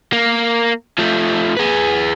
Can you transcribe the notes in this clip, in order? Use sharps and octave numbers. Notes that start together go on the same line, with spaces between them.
A#3
F3 A3
G#4 B4